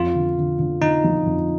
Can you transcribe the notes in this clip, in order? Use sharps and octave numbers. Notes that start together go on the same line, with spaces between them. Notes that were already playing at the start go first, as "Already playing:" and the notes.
Already playing: F2 F4
D3
D3
D3
D3 D#4
F3
F2